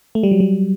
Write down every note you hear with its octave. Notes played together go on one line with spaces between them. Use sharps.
A3
G3
F#3
G3